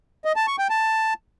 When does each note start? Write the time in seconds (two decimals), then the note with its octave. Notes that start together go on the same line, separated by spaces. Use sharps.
0.25 D#5
0.36 A5
0.47 C#6
0.59 G5
0.70 A5